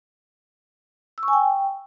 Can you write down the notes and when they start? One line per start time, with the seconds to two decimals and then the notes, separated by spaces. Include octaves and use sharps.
1.18 E6
1.23 C#6
1.28 G#5
1.33 G5